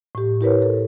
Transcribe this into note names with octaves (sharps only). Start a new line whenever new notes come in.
A2 G4
E4 G4 A#4 B4 C#5
A4